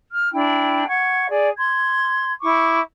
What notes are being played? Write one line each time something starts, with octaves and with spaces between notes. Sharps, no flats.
F6
D4 E4 G5
F#5 C#6 G#6
G#4 D5
C6 G#6
E4 C#6 D6